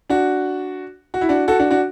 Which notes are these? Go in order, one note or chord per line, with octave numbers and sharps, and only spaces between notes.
D4 F#4
F#4
E4
D4 F#4
F#4 A4
D4 F#4
D4 F#4